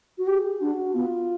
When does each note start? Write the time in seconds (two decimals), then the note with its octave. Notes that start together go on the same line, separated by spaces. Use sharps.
0.18 F#4
0.27 G4 G#4
0.60 D4 F#4
0.94 B3 F4